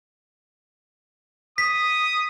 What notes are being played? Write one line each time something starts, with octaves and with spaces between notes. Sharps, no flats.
D#6 B6